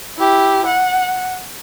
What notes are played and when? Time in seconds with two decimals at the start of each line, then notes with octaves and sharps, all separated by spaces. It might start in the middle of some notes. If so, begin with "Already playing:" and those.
0.17 E4 G4
0.66 F#5